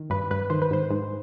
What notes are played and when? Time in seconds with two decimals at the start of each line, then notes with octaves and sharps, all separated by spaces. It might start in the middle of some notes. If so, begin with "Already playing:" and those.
Already playing: D#3
0.10 G2 B4
0.31 G2 B4
0.50 D#3 C5
0.62 B4
0.71 G#2 C5
0.90 G#2